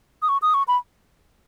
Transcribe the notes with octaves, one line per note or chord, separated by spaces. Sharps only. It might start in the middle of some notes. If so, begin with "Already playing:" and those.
D#6
C#6
D#6
C#6
B5